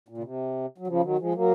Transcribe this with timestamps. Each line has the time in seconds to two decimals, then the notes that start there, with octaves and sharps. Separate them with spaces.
0.09 A#2
0.18 C#3
0.24 C3
0.78 F#3
0.87 C#3 F3
1.03 D#3 F#3
1.19 F3 G#3
1.34 F#3 A#3